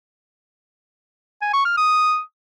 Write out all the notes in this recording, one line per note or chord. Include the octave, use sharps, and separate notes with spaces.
G#5
C#6
F6
D#6